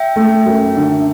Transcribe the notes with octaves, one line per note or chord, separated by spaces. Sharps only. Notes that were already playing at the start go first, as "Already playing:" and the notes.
Already playing: E5 G5
A3
F#2
D3